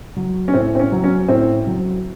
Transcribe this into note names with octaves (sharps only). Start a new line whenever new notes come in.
F#3
C#4
A2 C4
C4
C#4
F#3
C#4
A2 C4
F#3